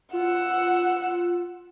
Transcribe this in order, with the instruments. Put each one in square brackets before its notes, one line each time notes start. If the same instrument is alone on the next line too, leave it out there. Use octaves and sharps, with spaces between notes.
[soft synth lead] F4 [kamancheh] F#5 E6